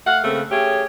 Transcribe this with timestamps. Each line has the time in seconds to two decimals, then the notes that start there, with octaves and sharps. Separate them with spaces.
0.06 A3 F5 F#5
0.24 C#3 A3 A#3 C4
0.51 A3 C#4 G4 G#4 C#5